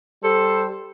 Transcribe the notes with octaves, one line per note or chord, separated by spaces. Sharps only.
G3 A4 C5